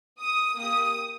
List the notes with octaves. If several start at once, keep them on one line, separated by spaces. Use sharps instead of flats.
D#6
A#3 G4 D#6